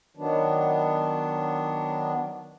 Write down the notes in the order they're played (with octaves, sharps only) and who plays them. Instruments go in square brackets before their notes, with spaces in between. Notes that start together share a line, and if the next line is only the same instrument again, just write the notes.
[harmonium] D#3 F#3 B3 D4